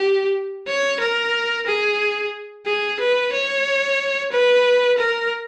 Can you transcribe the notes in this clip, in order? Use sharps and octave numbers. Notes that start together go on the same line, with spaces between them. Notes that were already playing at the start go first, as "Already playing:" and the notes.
Already playing: G4
C#5
A#4
G#4
G#4
B4
C#5
B4
A#4